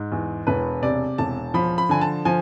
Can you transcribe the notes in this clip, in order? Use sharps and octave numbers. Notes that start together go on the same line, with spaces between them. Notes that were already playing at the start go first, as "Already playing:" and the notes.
Already playing: G#2
E2
E1 B4
C3 D5
E1 A5
F3 B5
B5
D3 G#5
A5
F3 G#5